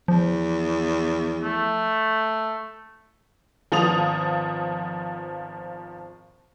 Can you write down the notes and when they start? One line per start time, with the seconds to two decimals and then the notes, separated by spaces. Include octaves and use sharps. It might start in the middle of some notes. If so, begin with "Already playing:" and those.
0.08 E2 F3
1.43 A3
3.72 G#1 F3 B3 A5 D#6 F7